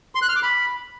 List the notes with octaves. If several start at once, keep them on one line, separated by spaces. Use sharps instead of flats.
C6
F#6
F6
D6
B5